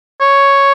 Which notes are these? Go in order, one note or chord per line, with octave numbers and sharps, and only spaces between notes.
C#5